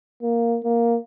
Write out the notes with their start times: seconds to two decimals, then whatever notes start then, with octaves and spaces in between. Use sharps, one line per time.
0.22 A#3
0.64 A#3